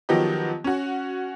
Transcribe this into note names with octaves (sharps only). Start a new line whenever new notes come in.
D#3 F3 F#3 B3 G4 D#5
C#4 F#4